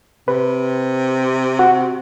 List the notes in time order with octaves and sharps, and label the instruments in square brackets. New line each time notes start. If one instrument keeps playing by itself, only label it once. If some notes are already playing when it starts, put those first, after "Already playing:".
[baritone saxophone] C3 [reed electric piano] B4
[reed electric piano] F#4